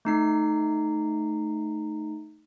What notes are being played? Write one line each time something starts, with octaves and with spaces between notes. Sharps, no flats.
A3 D#4 C7